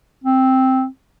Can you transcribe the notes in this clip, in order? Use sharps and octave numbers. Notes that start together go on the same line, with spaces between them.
C4